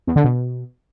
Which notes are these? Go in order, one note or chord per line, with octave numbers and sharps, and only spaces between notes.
E2
D3
B2